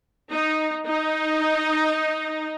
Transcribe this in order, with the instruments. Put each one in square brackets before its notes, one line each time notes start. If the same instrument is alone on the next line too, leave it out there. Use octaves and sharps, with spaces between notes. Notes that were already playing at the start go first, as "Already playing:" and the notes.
[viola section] D#4
D#4